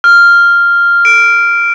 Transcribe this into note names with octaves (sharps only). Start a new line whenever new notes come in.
F6
D7